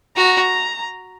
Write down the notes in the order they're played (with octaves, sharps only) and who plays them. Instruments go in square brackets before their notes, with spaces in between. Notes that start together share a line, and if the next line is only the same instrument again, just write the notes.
[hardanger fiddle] F#4 [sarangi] A#5